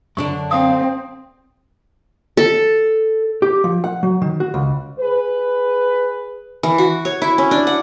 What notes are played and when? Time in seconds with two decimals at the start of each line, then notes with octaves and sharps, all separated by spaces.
0.17 F#2 D3 D4 C#6
0.51 C4 F5 D#6
2.37 A4
3.42 G4
3.64 F3
3.84 F#5
4.03 F#3
4.22 D#3
4.40 F#4
4.54 C#2
5.00 G#4 B4
6.63 E3
6.78 F#4
7.05 C#5
7.22 E4
7.38 C#4
7.51 D4
7.67 F#5